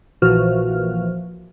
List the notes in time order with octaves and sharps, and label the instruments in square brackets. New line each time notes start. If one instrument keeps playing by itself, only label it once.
[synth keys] A#1 A#2 E3 F3 F#4 F6